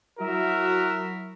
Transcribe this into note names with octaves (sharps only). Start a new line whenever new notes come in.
F#3 E4 F#4 A#4 E5